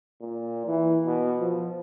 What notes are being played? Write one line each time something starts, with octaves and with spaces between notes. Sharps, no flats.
A#2
E3
B2
F3